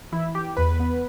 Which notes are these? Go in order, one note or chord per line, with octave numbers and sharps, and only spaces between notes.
E3 E4
E3 G4
E2 B4
B3